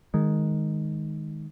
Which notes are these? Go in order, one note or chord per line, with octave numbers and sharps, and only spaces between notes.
D#3 G#3